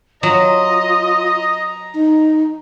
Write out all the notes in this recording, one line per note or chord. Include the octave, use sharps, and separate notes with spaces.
F#3 F4 D#5 A#5
D#4